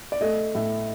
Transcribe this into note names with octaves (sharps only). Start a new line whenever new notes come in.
D5
A3 D#5
A2